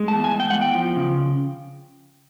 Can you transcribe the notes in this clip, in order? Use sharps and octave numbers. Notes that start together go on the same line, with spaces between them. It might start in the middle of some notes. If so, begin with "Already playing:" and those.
Already playing: G#3
A5
E2
G#5
G#3
G5
E2 F#5
G5
F3
C#3